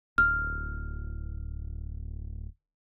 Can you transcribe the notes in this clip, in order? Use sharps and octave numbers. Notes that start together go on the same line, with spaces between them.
D1 F6